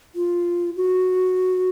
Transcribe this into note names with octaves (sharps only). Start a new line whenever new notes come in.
F4
F#4